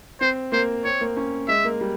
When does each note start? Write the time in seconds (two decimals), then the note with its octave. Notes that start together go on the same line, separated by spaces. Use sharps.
0.21 C4 C5
0.52 A#3 C5
0.85 C4 C#5
1.01 A#3
1.17 C#4
1.48 G#3 E5
1.65 A#3
1.81 G3